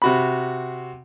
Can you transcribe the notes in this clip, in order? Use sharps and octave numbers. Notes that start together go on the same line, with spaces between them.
C3 F#4 B5